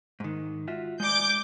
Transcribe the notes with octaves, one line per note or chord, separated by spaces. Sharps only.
G#2 D#3
F4 F#4 E5
G#3 D5 D6 G6